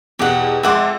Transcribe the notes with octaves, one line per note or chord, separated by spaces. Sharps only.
E2 B2 G4 F#5
F2 G#3 E5 F#5 C6 D6